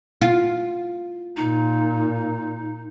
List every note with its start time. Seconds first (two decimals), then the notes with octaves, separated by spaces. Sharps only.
0.21 F4
1.37 A#2 D#4